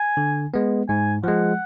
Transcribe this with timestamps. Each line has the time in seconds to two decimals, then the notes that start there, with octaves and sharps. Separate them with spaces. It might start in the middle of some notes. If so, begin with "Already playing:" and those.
Already playing: G#5
0.17 D3
0.54 G#3 B3
0.89 G#2 G#5
1.24 F3 G#3 F#5